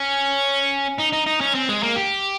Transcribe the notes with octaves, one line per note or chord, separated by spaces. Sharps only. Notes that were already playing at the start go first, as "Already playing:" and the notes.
Already playing: C#4
D#4
D#4
D#4
C#4
C4
G#3
A#3
G4